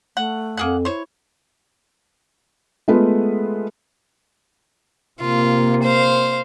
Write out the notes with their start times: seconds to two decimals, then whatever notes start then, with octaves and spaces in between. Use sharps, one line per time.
0.17 A3 F#5
0.57 F2 A#3 G#4 F#5
0.85 E4 C5 C#5
2.88 G#3 A3 B3 F4 B4
5.21 C3 A#3 F4
5.83 C5 F5